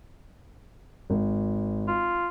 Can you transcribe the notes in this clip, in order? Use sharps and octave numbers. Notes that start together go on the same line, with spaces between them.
G#1
F4